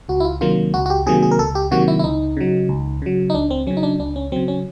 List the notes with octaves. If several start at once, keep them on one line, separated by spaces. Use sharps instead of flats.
C#2 F#4
E4
F4
C3 D#3 F#3 A#3 F4
C#2 F#4
F#4
G4
C3 D#3 F#3 A#3 G#4
G#4
A#4
C#2 A4
G4
C3 D#3 F#3 A#3 F#4
E4
E4
C#2 D#4
C#3 F#3
C#2
C#3 F#3
D#4
C#2 D4
C4
C#3 F#3 C#4
D#4
D4
C#2 D4
C#4
C#3 F#3 C4
C#4